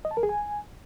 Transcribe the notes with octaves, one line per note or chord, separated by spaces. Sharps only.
D#5
A5
A#4
G#4
G#5